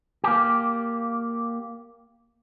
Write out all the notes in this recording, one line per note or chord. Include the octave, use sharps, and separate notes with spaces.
A#3 G4